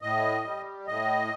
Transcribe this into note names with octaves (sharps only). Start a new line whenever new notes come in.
A2 D#5
G3
A2 D#5